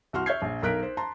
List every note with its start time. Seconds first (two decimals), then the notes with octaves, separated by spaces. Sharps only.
0.13 C2 F#4 C6 F6
0.26 C#5 E5 F6 G6 G#6 C7
0.42 A#1
0.63 B1 A#4 F#6 B6 D7
0.83 C5
0.97 A5 A#5 C6